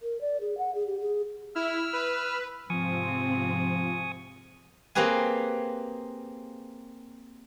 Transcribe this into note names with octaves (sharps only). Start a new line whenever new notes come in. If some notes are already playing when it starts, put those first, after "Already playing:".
A#4
D5
G#4
F#5
G#4
G4
G#4
E4 E6 F6
B4
G#2 C3 F3 C4 G#5 C#6 D#6
A#3 C4 G4 G#4 B4 G#5